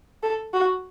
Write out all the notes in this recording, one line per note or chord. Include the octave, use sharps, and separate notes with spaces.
A4
F#4